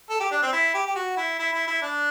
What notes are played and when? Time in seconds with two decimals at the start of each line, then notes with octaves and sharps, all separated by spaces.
0.10 A4
0.20 G4
0.31 D4
0.42 C4
0.53 E4
0.74 G4
0.86 G4
0.95 F#4
1.17 E4
1.39 E4
1.53 E4
1.68 E4
1.82 D4